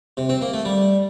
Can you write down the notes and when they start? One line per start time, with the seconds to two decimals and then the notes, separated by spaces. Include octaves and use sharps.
0.17 C3
0.29 C4
0.41 A#3
0.53 A3
0.65 G3